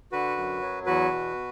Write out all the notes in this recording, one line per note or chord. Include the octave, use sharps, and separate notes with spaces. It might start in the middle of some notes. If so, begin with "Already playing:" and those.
D3 F#4 B4
F#2
F#3
E2 F#4 B4
B2